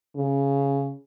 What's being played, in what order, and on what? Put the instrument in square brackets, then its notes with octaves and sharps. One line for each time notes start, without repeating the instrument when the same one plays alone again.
[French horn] C#3